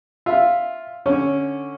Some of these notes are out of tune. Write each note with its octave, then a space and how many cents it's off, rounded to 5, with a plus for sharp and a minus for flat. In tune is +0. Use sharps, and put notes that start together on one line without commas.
F4 +0 E5 +0
D3 +0 C#4 +0